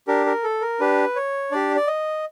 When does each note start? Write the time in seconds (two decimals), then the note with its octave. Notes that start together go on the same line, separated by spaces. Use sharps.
0.08 D4 G4 A#4
0.26 A#4
0.44 A4
0.62 A#4
0.80 D4 G4 B4
1.16 C#5
1.51 D4 G4 D5
1.76 D5
1.87 D#5